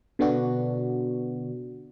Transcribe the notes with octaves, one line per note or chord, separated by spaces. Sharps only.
B2 D3 B3 D4 F#4